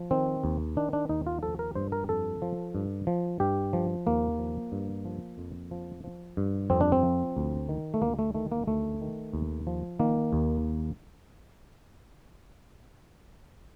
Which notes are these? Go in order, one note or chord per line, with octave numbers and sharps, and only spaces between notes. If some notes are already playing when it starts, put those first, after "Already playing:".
Already playing: F3
D#3 C4
D#2
D#3 D4
D4
D#2 D#4
F4
F3 A4
A#4
G2 C5
A#4
F2 A4
F3
G2
F3
G2 G4
F3
D#2 A#3
F3
G2
F3
F2
F3
F3
G2
F2 C4
D4
C4
F3
D2
D#3
A3
D2 A#3
A3
D#3 A3
A#3
D2 A3
D#3
D#2
F3
D#3 A#3
D#2